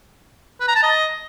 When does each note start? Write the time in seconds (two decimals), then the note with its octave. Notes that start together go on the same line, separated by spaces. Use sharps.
0.61 B4
0.68 A#5
0.75 A5
0.83 D#5